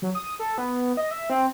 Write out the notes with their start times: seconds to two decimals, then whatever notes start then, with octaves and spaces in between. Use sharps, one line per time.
0.02 F#3
0.15 D#6
0.39 A4
0.58 B3
0.97 D#5
1.11 E5
1.30 C4